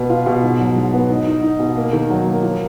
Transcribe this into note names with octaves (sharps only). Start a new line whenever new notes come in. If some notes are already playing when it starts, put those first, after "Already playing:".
Already playing: B2 B4
F4
B2
G#2
F#3
G#2
B3
D#4
D#4
D#4
B2
A#3
D#3
F#3
A#3
F3